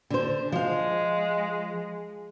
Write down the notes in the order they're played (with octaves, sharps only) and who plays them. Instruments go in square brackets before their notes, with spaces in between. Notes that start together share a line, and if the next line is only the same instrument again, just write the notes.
[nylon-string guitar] D3 C5
[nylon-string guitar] F3 F5 [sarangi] G#3